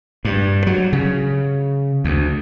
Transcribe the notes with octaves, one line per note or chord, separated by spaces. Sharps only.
G2
F#3
C#3
D2